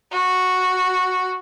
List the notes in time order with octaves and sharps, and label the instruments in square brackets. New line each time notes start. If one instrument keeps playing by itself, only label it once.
[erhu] F#4